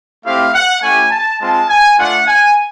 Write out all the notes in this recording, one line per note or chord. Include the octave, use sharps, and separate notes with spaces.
A3 C4 E4 G4 F5
F#5
A3 C#4 E4 G4 G#5
A5
G#3 C4 F4 A5
G#5
A3 D4 F4 F#5
G#5